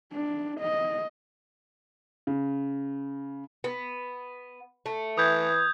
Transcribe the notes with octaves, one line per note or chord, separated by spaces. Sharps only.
D4
D#5
C#3
B3
A3
E3 D#6 G6 G#6